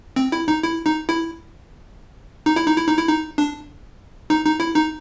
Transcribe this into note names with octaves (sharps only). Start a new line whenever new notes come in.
C4
E4
D#4
E4
D#4
E4
D#4
E4
D#4
E4
D#4
E4
D#4
D4
D#4
D#4
E4
D#4